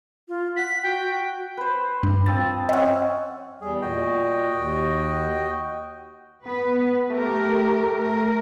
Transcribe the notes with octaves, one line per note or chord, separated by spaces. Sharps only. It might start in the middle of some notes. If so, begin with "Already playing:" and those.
F4
F#5 B6
F#4 G5
B4 C5
G2
F3 C4 D#5 A6
C4 C#4 D#5 F#5
E2 G3 G#4
A#2 F#4 D#5 G5
D#2
B3 B4
A3 G4 A#4
A#4